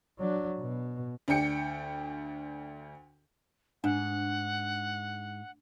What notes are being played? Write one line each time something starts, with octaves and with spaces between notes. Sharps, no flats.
F#3 D4
B2
D2 D4 G5 C#7
G#2 D4 F#5